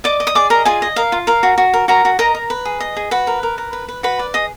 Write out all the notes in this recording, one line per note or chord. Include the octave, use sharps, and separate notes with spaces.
D5 D#5 D6
D#5
D#6
G#4 D5 D6
A#4 D#5 A#5
F4 G#4 G#5
D#5
A#4 F5
F4
A#4 F5
F#4
F#4
A#4
F#4 A#4 A#5
F#4
A#4 D#5 A#5
A#4
B4
G#4
D#5
G#4
F#4 B4 B5
A#4
A#4
A#4
B4
B4
F#4 B4 B5
D5
G#4 D#5 D#6